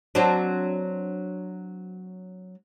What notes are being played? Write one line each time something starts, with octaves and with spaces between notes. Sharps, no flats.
F#3 C4 D4